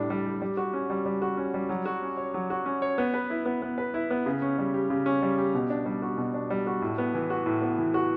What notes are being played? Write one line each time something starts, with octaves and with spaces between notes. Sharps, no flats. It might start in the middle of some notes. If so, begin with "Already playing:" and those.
Already playing: A2 G3 D4
G3
G4
G3
F#4
C#4
G3
G3
F#4
C#4
G3
F#3
F#4
C#4
C#5
F#3
F#4
C#4
C#5
B3
B4
E4
B3
B3
B4
E4
B3
C#3
C#4
G3
G4
C#3
C#4
G3
G4
B2
D4
G3
F#4
B2
D4
G3
F#4
A2
B3
E3
F#4
A2
B3
E3
F#4